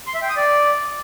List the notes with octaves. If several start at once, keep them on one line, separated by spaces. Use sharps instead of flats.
C6
E5
G5
D#6
D5